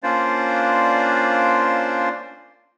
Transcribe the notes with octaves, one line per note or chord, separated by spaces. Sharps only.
A#3 C#4 D4 F4 C5 D5